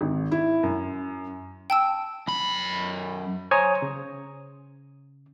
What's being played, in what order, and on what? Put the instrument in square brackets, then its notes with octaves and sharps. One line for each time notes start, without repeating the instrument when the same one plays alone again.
[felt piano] G#1
E4
F#2
[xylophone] G5 A5 E6
[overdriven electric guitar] F#2 B5
[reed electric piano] C5 C#5 G#5 A#5 D#6
C#3